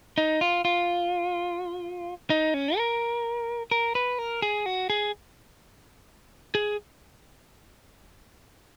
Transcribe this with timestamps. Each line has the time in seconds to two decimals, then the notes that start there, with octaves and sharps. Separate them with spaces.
0.18 D#4
0.41 F4
0.65 F4
2.30 D#4
2.54 C#4
2.77 A#4
3.71 A#4
3.95 B4
4.18 A#4
4.42 G#4
4.66 F#4
4.90 G#4
6.55 G#4